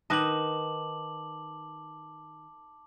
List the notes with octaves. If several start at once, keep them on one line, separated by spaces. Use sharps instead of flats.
D#3 B4 D#5 A5 D6 F#7